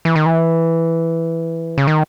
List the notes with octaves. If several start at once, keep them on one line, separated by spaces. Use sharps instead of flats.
E3
D#3
E3
C#3
D#3